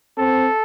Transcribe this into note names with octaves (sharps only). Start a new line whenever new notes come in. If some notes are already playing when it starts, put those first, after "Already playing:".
C4 A4